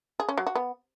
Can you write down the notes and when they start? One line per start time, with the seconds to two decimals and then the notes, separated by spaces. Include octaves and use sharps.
0.20 G#4
0.29 C#4
0.38 F#3
0.47 F#4
0.55 B3